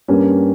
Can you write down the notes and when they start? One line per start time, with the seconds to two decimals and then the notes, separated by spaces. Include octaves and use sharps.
0.08 G2 G3 A#3 C#4